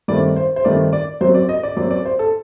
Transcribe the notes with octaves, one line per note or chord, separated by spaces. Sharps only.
G2 D#3 A3 C4 D5
C5
C5
G2 D#3 A3 C4 D5
D5
F#2 F#3 C4 C5
D5
D#5
D5
F#2 F#3 C4 D5
D5
C5
A4